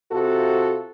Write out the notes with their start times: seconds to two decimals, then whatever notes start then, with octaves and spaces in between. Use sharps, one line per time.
0.12 C3 F4 F#4 A4